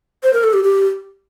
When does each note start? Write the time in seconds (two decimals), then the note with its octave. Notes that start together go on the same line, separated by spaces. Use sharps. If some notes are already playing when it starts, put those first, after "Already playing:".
0.23 C5
0.33 A#4
0.44 A4
0.53 G4
0.64 G4